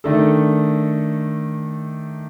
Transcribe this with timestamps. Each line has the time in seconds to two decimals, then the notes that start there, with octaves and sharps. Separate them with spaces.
0.04 D#3 A3 D4 A4